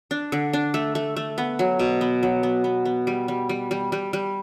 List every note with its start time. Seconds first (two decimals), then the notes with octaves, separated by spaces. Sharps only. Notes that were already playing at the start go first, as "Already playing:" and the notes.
0.11 D4
0.32 D3
0.53 D4
0.74 A3
0.95 A3
1.16 A3
1.38 B3
1.59 F#3
1.79 B2
2.01 B3
2.23 F#3
2.43 B3
2.64 B3
2.85 B3
3.07 G3
3.28 G3
3.49 G3
3.71 G3
3.92 G3
4.13 G3